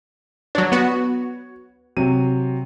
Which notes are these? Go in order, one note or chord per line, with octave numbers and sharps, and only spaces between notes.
F#3 D4 C#5
B3 F#4
C3 F#3 D#7